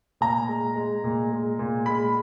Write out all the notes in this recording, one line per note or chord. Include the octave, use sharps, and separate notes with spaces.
A#2 A#5
G#3
G#3
A#2
G#3
A#2
G#3 B5